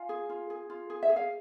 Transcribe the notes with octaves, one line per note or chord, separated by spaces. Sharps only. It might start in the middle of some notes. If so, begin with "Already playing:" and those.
Already playing: F4 F5 G#5
G#4
F4
G#4
F4
G#4
E5
G#4
F5